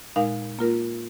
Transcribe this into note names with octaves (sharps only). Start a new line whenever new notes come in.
A#2 G#3 D#4 A#4 F5
A#3 F4 A#4